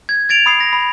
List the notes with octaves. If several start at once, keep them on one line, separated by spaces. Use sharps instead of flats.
G#6
G#6 A6 D7 F7
B5 D#6 C7
A#6
B5